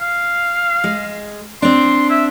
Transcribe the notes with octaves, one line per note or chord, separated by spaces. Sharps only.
F5
G#3
C4 D4 C6
E5